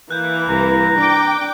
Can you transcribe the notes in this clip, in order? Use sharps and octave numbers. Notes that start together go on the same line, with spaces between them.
E3 A#3 F#6 G6
C2 A#5
D4 G5 D6